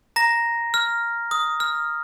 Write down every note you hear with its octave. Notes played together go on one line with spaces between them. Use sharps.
A#5 A#6
F6
D#6
F6